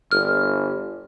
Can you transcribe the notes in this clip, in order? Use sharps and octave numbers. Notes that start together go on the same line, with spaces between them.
G1 F6